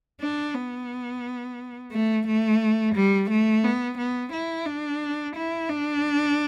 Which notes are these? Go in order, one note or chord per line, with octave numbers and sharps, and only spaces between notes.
D4
B3
A3
A3
G3
A3
B3
B3
E4
D4
E4
D4